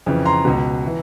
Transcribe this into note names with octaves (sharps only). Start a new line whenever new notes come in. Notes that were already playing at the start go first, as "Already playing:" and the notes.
F2 C#3 E3
A#5 C6
C#2 B2
E3